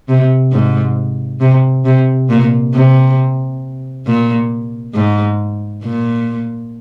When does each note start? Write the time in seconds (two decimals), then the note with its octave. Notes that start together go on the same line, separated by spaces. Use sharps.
0.09 C3
0.52 G#2
1.41 C3
1.85 C3
2.30 A#2
2.74 C3
4.07 A#2
4.95 G#2
5.84 A#2